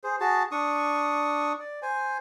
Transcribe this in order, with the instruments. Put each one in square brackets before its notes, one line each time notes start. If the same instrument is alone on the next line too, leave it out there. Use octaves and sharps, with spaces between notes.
[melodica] G#4 C5
F#4 G#4 A5
D4 C#6 D#6
D5
C5 G#5